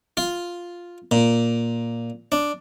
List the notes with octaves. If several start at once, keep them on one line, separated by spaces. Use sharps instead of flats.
F4
A#2
D4